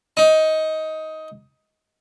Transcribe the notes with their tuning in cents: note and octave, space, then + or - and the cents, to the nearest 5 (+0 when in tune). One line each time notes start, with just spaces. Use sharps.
D#4 +15